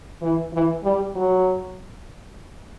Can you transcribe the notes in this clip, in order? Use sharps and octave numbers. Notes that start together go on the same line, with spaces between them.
E3
E3
G3
F#3